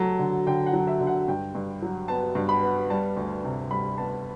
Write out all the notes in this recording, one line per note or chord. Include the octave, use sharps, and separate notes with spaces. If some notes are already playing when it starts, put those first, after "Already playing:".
Already playing: F#3 A3 A5
D3
D3 G5
F#5
F#3
E5
D3
F#5
G2 G5
G2
F#3
B3 A5
G2
B5
B3
G3 A5
D2
C3
G3 B5
B3 A5